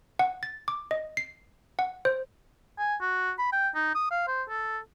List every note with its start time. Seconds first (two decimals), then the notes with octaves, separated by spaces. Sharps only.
0.19 F#5
0.43 A6
0.68 D6
0.91 D#5
1.17 C7
1.79 F#5
2.05 C5
2.79 G#5
3.01 F#4
3.39 B5
3.53 G5
3.75 D#4
3.95 D#6
4.11 F5
4.28 C5
4.49 A4